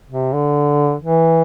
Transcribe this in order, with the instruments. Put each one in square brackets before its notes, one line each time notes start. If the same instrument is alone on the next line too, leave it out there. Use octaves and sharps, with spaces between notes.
[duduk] C3
D3
E3